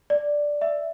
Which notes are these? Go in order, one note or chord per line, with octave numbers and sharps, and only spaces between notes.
D5
E5